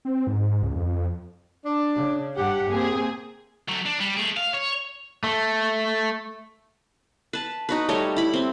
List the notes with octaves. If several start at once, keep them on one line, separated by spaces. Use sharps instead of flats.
C4
G#2
C#2
F2
D4
C#3
G2 G4 F#5
A#3 C4 G#4
F#3 A3
D4
G3
A3 G#4
F5
C#5
A3
B4 A5
D#4 F#4 B4
G3 A3 C#5 D#5
E4 B5
C4